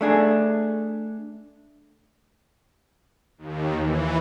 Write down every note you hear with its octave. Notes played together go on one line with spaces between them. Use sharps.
A3 D4 G#4
D#2
E3